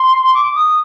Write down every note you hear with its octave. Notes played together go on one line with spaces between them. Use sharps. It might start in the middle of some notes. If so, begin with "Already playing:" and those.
Already playing: C6
D6
D#6